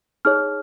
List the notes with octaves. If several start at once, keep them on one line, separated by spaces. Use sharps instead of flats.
D#4 G#4 C#5 F6